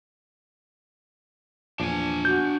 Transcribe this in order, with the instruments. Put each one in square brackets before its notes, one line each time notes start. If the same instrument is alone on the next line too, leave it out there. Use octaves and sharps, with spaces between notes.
[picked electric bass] E2 A#2 F3 [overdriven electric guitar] D4 G#5
[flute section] F#4 [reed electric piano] G6